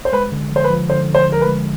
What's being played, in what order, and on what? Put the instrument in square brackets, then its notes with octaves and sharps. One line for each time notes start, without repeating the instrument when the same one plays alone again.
[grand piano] C5
[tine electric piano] G#3 [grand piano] B4
[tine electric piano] D3
F3
[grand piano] C5
B4
[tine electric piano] F3
[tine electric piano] D3 [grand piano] C5
[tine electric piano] D3
[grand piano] C5
[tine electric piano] F3 [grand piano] A#4
[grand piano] B4
[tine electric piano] G#3